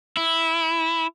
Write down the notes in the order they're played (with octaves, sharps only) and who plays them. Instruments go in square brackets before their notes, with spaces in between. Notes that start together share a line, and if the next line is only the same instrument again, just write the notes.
[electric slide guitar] E4